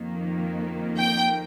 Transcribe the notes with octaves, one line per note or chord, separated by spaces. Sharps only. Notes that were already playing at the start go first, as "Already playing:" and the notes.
Already playing: F2 D#3 A#3
G5